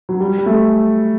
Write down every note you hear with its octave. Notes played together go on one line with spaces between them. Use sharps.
F#3
G3
G3
A3